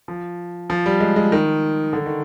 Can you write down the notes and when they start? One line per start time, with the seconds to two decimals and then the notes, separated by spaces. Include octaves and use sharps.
0.08 F3
0.70 F3
0.86 G3
1.00 G#3
1.16 G#3
1.32 D#3
1.93 D3
2.06 D#3